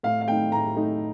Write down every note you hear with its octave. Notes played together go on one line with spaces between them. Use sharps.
A2 F5
F5
A3 D#4 G5
A2 A#5
A3 D#4